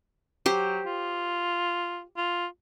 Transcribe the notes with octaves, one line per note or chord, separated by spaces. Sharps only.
F#3 G4 C5
F4
F4